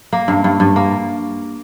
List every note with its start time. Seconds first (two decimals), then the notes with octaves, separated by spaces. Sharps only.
0.13 A#3
0.28 G2
0.44 G2
0.60 G2
0.76 A#3